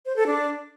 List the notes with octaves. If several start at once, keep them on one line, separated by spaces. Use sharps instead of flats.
C5
A4
D4